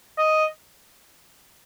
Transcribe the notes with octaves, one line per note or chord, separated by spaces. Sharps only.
D#5